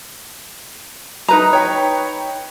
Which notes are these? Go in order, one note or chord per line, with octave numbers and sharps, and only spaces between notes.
D#4 B4 A#5
C#5 G5 B5